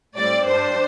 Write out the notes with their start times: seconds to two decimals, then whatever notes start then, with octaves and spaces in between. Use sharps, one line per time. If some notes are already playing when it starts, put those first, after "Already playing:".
0.17 A2 G3 C4 D5
0.46 G2 G3 D4 C5